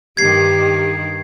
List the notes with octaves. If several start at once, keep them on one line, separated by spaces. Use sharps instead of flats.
G2 D#3 G4 G#6 C7